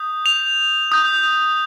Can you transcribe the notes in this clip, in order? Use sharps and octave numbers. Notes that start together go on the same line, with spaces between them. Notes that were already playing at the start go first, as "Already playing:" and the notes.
Already playing: D#6 G6
F7
D#6 G6